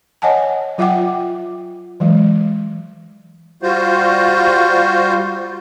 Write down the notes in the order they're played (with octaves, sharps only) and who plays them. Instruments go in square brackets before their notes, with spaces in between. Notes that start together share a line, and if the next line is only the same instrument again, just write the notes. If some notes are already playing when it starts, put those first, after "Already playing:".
[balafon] C#5 D#5 F#5 G#5 A5
F#3 F4 E5 F#5 G5 D6
E3 F#3 G#3
[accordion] G3 F4 F#4 C5